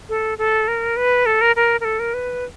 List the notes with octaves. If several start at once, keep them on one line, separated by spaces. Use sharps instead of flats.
A4
A4
A#4
B4
A4
A#4
A#4
A#4
A4
A#4
B4